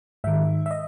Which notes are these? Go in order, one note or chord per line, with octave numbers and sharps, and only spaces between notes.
G#2 D#3 E5
E5
D#5